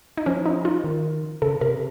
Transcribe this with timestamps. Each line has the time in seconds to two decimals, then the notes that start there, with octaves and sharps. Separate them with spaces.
0.17 D#4
0.26 F3 C#4
0.46 D#4
0.65 F4
0.84 D#3
1.42 C#3 A4
1.61 C3 A#4